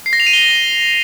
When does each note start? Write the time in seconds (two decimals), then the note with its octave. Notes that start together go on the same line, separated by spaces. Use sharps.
0.06 C7
0.13 A#6
0.20 F7
0.27 D#7
0.33 G7